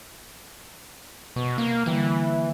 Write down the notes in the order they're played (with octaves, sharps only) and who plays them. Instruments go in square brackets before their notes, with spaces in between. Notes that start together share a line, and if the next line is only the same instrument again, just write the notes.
[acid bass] B2 [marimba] C#6
[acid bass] A#3
[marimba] D3 G3 A#3 [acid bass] E3